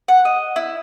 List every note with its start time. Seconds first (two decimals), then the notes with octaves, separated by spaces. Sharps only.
0.08 F#5
0.25 D#5
0.56 E4